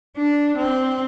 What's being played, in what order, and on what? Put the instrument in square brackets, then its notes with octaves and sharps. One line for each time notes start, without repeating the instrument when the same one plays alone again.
[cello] D4
C4